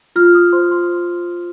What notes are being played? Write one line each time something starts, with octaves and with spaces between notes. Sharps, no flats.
F4 F6
D#6
C5 C6
C6